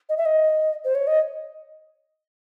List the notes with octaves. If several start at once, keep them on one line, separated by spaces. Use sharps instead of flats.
D#5
E5
D#5
C5
C#5
D#5